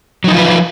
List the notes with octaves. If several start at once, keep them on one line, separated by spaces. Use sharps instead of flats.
F3 F#3 D#4 F4 B4